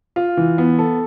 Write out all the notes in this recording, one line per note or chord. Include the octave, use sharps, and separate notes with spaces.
F4
E3
B3
A4